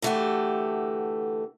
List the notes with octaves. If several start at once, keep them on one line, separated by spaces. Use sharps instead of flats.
D3 E3 A3 B3 F#4 G4